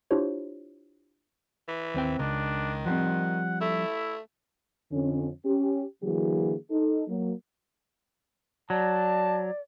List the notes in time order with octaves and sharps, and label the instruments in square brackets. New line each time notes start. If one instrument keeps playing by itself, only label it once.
[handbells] D4 E4 F4 G4 C5 C#5
[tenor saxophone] E3
[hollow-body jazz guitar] D#2 C4 G5
[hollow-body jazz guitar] C#2 [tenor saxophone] D#3 [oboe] D4
[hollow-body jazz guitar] F3 G3 C4 [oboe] F#5
[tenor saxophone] A3 [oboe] E4
[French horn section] F2 D3 C#4
C#4 G4
D3 E3 F#3 A#3 F#4 G#4
D#4 A4
F#3 A#3
[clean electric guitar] F#3 [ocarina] D5 [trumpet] A5